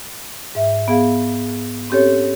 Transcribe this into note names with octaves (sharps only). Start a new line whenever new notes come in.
G#2 E5
B3 G#4 F5
C4 C#4 G4 A4 C#5